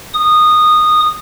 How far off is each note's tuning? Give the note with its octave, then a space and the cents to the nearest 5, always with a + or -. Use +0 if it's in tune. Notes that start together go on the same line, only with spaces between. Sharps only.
D#6 -15